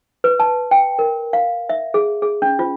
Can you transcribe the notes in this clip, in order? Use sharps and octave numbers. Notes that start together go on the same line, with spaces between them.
B4
A5
G5
A#4
F5
E5
G#4
G#4
C#4
F4